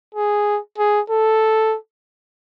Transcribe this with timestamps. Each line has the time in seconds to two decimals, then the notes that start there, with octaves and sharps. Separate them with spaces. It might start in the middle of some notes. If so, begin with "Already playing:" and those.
0.15 G#4
0.78 G#4
1.10 A4